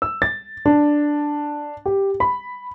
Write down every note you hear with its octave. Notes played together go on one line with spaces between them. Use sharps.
E6
A6
D4
G4
B5